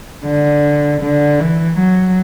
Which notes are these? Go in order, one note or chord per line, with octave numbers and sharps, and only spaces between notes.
D3
D3
E3
F#3